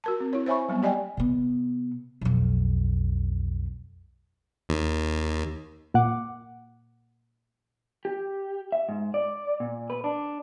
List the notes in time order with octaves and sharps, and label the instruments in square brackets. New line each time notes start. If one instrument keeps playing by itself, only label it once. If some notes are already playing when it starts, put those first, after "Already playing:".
[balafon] F#4 A#4 A5
C4
E4 C#5
C5 C#5 E5 G#5 B5 C#6
F#3 G3 B3
A#3 G4 D5 D#5 G5 G#5
[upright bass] C3 B3
B1 F2
[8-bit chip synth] D#2
[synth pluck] A#2 F#5 D6
[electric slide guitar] G4
E5
G#2
D5
A#2
B4
D4